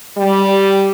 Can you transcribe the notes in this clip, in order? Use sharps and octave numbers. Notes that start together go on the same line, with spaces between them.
G3